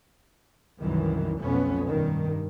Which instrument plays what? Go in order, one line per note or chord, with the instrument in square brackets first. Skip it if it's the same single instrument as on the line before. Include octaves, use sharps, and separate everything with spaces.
[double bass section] C2 F#2 D#3 E3
B1 F2 A3 B3 C#4
G2 D#3